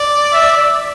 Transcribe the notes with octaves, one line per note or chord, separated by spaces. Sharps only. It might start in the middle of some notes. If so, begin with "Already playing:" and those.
Already playing: D5
E5